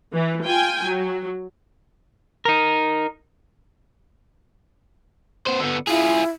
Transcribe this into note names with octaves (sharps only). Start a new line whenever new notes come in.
E3
F4 G5 G#5
F#3
D#4 A#4
B3 C5
D3 B3
E4 F4 G#4